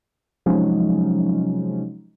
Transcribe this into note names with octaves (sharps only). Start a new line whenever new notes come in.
C3 F3 F#3 G#3 C#4 D#4